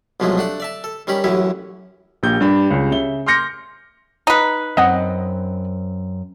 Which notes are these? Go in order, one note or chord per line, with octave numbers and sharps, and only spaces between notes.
C2 B2 F3 F#3 G#3 A3
A3 D4 F#5
D5 E5 A5
A4
D#3 G3 C#4 G4 B5
A1 F#2 E3 C#4 C#5 E5
A#1 G4 G6
G2 D4 B5
C#2 C#3 G3 C#4
C#3 E5 G7
C6 D6 F6 G6 A#6 C#7
D#4 B4
F#2 C4 D#5 F#5